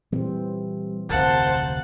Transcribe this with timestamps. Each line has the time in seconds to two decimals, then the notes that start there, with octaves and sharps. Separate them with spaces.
0.12 A#2 E3 G3 C4
1.10 F1 D2 C3 A#4 C5 F5 F#5 A5